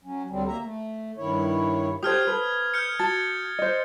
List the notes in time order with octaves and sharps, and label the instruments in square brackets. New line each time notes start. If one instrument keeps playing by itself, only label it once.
[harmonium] F#3 C#4
D2 D3 F#3 G3 C4
D#2 A#3 E5 A#5
A3
G2 D#3 E4 C#5
[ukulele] G4 A4 C5 [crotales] D#6 F6 G#6
[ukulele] A4 B4
[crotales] F6 G6 C#7
[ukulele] F#4 A5 [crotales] A6
[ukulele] C5 D#5